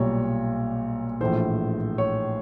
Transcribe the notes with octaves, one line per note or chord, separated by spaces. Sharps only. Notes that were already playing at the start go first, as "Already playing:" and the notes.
Already playing: B1 A#2 G3 C#5
A#1 A2 E3 C5
C#5